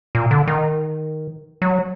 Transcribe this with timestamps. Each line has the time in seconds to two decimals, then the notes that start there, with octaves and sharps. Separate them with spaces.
0.15 A#2
0.31 D3
0.48 D#3
1.62 F#3